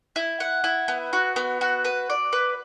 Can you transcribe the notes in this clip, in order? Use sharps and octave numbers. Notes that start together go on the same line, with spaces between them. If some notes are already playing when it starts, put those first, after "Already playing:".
E4
F#5
E4
B3
F#4
B3
F#4
B4
D5
B4